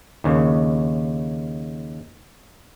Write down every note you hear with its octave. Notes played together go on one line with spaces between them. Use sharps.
D#2 C#3